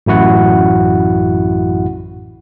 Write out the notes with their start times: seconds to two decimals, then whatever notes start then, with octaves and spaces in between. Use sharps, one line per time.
0.06 A1 F#2 E4 F#4 F#5